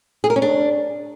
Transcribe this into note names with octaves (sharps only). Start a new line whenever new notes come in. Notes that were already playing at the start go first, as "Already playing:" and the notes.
G#4
A#4
C#4
D4